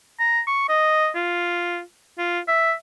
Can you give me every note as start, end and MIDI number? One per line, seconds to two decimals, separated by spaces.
0.20 0.40 82
0.47 0.69 85
0.69 1.09 75
1.15 1.81 65
2.18 2.39 65
2.48 2.73 76